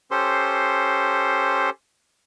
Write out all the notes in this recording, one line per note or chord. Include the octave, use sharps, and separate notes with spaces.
C#4 G4 A4 C5 C6